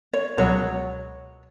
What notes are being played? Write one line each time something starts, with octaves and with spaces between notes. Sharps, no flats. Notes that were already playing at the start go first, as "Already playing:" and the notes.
C#5
C#2 B2 F#3 C#5